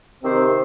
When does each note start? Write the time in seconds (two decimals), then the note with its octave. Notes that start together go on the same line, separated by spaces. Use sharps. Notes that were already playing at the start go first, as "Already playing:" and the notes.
0.23 C3 D#3 C4 G4 C5